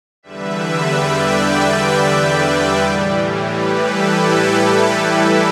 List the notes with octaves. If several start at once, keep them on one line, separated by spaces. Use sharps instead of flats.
E2 D3 G3 B4 E5
D5 G5
B4 E5
A2 E3 G3
G4 B4
E4 A4